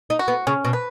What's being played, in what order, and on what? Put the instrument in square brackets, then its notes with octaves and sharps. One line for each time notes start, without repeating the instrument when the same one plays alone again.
[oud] D#4
[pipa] F#4
[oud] B3
[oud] C#3 [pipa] C#4
[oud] B2
[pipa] B4